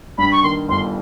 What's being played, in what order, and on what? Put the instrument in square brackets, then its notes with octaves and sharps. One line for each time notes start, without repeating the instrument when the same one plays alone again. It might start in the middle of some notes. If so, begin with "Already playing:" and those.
[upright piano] G2 [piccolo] B5
[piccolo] C#6
[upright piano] D#3 [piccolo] C6
[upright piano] G1 [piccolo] C6